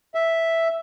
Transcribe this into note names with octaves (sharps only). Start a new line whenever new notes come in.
E5